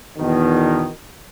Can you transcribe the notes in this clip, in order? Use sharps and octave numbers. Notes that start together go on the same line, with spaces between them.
E2 B2 D#3